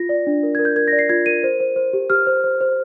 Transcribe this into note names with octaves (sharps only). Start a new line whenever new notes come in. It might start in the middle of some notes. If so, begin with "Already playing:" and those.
Already playing: F4 A#6
D5
D4
A#4
A#4 G#6
G6
A#4 G#6
A#6
D5
C7
F4 G#6
A#4 D#7
C5
C5
C5
G4
G4 F6
C5
C5
C5